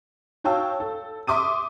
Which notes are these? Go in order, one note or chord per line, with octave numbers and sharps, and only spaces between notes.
F#4 C#5 F5 G5 A5 E6
A4
E5 C6 D6 D#6 D#7